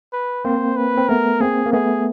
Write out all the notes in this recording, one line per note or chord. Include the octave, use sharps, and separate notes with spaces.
B4
A#3 C4 C5
B4
C4
A3 B3 A#4
A#3 C4 G#4
A#3
A3 B3 G#4